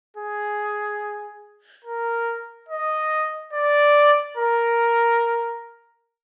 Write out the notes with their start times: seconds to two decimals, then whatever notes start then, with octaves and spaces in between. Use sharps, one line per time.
0.16 G#4
1.85 A#4
2.69 D#5
3.53 D5
4.37 A#4